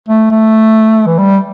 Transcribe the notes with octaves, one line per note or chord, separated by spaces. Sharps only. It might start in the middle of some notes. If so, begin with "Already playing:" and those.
A3
A3
E3
G3